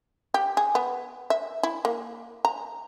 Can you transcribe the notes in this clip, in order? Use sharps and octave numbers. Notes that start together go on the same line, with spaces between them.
G4
G#4
B3
E5
E4
A#3
A#5